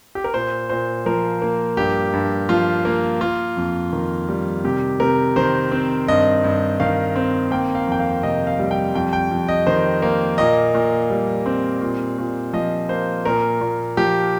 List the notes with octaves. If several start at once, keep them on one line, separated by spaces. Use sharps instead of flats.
G4
A#4
A#2 C5
A#2 C5
F3 A#4
A#3
G2 G4
G2
F3 F4
A#3
A#3 F4
F2
D#3
G3
C3 G4
C3 A#4
D#3 C5
C4
G2 D#5
G2
D#3 F5
C4
A#3 G5
F5
F2 G5
F5
C3 D#5
F5
G3
G5
F2 G5
G5
F2
D#5
D#3 C5
A#3
A#2 D#5
A#2
G3
C4
A#2
A#2
F3 D#5
A#3 C5
A#2 A#4
A#2
F3 G4